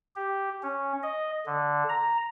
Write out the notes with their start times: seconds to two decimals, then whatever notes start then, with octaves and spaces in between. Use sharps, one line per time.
0.16 G4
0.63 C#4
1.03 D#5
1.46 D3
1.89 A#5